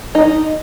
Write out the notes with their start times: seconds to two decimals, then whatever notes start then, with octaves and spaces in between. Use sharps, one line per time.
0.15 D#4